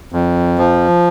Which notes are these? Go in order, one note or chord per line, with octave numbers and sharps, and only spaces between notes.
F2
F3